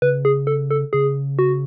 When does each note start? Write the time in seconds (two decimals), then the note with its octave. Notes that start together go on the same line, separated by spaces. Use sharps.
0.02 C#3 B4
0.25 G#4
0.47 A4
0.71 A4
0.93 C#3 G#4
1.39 F#4